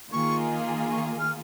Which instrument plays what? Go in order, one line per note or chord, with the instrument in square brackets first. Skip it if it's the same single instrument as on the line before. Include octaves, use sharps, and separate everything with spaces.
[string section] D#3 A#3 F4 G#4 [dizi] C#6
[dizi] C#6
F6